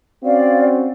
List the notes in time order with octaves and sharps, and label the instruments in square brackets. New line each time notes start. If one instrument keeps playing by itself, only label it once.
[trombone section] C4 C#4 F#4 [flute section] D5 F5